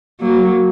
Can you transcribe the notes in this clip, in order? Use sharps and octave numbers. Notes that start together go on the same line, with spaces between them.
F#3 A#3